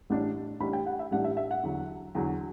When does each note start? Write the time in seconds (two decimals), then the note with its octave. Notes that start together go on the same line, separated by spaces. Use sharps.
0.10 A1 A2 G3 D4
0.60 A1 A2 G3 D4 B5
0.73 G5
0.86 F#5
0.99 E5
1.11 A1 A2 G3 D4 F#5
1.24 E5
1.37 E5
1.51 F#5
1.63 E2 D3 F#3
2.15 E2 D3 F#3